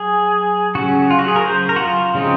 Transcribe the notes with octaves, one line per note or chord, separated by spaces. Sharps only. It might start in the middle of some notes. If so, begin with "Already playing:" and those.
Already playing: F#3 G#4
C#3 F#3 C#4 F#4
F4
F#4
G#4
A#4
C5
A#4
F#4
F4
C#3 F3 G#3 C4 D#4